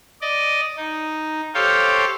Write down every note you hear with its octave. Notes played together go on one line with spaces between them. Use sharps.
D5 D#5
D#4
G4 A4 C5 C#5 F5 G5